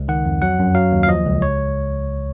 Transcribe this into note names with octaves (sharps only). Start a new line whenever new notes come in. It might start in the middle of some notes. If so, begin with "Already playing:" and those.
Already playing: C#2
D#3 F#5
F2
F#3 F#5
F#2
F#3 F5
D#2
F5
F3 D#5
C#2
C#5